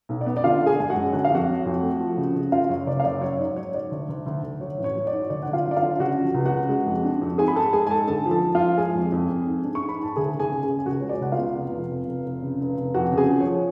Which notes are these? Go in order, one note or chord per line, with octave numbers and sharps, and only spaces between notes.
B1
D5
B3
D5
D3 F4 F5
D3
G#4 G#5
G#3 G#5
F#4 F#5
F#2
D3 F#5
F5
F2 F#4 F#5
F#3
F2
A3
F3
C#3
C#3
C#3 F4 F5
F#2 C#5
F#1 D5
F5
F#2 D5
F#3 C#5
G#2 D5
F#3 C#5
G#2 D5
D2
D2
D2
D2
F#3 C#5
A1
C#5
F#3
D5
G#2
D2 D5
D2 F#5
F4 F5
F#3
D5
F4 F5
D3
C#3 F#4 F#5
F3
C#2
F#4 F#5
C#3
G#3
F2
D4
F2
G#2 G#4 G#5
B5
G#2 A4 A5
G#3 G#4 G#5
G#5
G#2 A4 A5
D3 A4 A5
F3
A4 A5
F3
F4 F5
F3
G#3 G#4 G#5
F2
F2
F2
G#2
D4
C#6
G#2
B5
G#2 A5
D2 G#4 G#5
D2
G#4 G#5
C#3
G#4 G#5
C#3
G#5
C#2 F#4 F#5
G#3 C#5
D5
C#2 F#5
F4 F5
B3
F1
F2
F1
F1
F1
C#3
F1
F1
F2 F#4 F#5
C#3
G#4 G#5
F3
C#5
F3